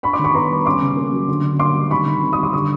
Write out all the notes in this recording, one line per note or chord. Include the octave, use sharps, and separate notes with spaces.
D4 B5 C#6
C6 D6
D#3
B5 C#6
B3 A#5 C6
G3
C#4 C6 D6
C#3
A#3
F#3
D3
D3
A#3 C6 D6
G3
D#3 B5 C#6
D#3
C4
C#6 D#6
G3 C6 D6
D3 C#6 D#6